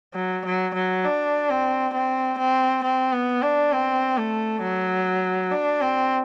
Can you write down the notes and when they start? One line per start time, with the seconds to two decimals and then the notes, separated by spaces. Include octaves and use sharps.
0.15 F#3
0.45 F#3
0.74 F#3
1.04 D4
1.50 C4
1.94 C4
2.39 C4
2.84 C4
3.12 B3
3.43 D4
3.72 C4
4.18 A3
4.62 F#3
5.51 D4
5.81 C4